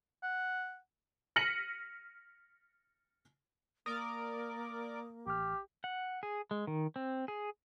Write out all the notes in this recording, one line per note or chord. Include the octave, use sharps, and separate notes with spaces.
F#5
F6 A#6 B6 C#7 D#7 F#7
A#3 A#4 D5 D6 D#6
A1 G4 F6
F#5
G#4
G#3
D#3
C4
G#4